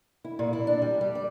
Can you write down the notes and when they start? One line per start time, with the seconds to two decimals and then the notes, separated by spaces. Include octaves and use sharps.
0.24 E4
0.39 A#2
0.53 E4
0.67 D4
0.82 G3
1.01 G3
1.15 D5